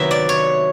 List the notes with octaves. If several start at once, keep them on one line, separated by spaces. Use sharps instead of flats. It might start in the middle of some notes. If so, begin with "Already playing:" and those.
Already playing: C3 D#3 F#3 B3 E4 E5
D5
C#5